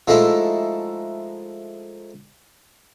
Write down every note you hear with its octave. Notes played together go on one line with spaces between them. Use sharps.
F3 G#3 A3 D#4 E4